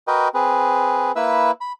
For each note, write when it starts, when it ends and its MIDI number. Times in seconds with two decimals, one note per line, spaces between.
0.08 0.28 66
0.08 0.28 70
0.08 0.28 71
0.08 0.28 75
0.08 0.28 79
0.34 1.12 60
0.34 1.12 68
0.34 1.12 71
1.16 1.51 58
1.16 1.51 64
1.16 1.51 71
1.16 1.51 76
1.16 1.51 88
1.61 1.72 83